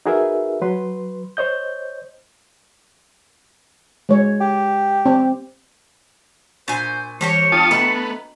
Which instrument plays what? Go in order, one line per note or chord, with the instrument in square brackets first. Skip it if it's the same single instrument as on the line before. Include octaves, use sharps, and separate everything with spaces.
[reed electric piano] D#4 F#4 G#4 A#4 B4 E5
F#3 B4 C6
C5 C#5 D#5 G6
[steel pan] G#3 C#5
[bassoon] G4
[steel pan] C4
[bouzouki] A#2 G#5 [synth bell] D4 C#6 [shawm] C5
[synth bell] E3 A5 D6 [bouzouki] A#3 G4 C#5 [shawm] C#6
[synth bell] B3 [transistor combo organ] F4 A5 D#6
[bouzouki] A3 A4 B4 [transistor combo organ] B3 [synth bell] D4 D#5 A#5